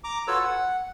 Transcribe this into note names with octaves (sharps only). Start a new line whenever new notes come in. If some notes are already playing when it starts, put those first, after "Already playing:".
A#5 D6
F4 F#4 A4 B4 C#5 E6
F#5